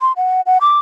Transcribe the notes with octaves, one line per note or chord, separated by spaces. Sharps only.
C6
F#5
F#5
D6